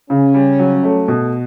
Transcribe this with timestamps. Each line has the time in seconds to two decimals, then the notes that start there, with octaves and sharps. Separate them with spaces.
0.10 C#3 C#4
0.34 G3
0.59 F#3
0.83 A3
1.08 B2